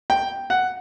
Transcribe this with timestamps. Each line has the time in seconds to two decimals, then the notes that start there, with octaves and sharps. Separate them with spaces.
0.10 G5
0.50 F#5